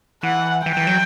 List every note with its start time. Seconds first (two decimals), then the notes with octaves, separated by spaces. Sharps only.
0.23 E3 F#5
0.66 E3 G5
0.77 E3
0.87 F#3